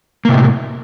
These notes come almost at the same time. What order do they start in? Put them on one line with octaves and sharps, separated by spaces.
A#3 C3 A2